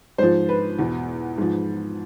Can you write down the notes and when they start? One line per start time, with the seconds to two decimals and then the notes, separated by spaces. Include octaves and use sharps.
0.18 G#2 F3 C5
0.49 B4
0.79 E2 B2
1.38 G#2 F3